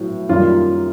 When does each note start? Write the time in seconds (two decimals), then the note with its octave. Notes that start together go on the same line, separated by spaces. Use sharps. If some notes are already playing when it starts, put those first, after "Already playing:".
Already playing: A2 F#3 B3
0.29 F#2 D#3 G3 A#3 F4